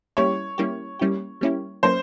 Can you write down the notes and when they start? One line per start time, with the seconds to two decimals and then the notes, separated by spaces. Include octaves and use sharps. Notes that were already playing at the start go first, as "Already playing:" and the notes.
0.17 G3 A#3 C#4 E4 G4 C#5
0.58 G3 A#3 C#4 E4 G4
0.99 G3 A#3 C#4 E4 G4
1.41 G3 A#3 C#4 E4 G4
1.83 F#3 A#3 C#4 C5